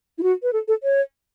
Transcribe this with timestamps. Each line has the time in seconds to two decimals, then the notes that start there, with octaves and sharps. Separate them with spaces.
0.18 E4
0.23 F#4
0.43 B4
0.53 A4
0.68 A4
0.83 C#5